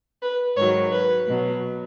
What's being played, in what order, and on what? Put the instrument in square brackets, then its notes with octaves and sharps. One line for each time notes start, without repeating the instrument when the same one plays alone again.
[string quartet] B4
G#2 D#3 F#3 C#5
B4
B2 F#3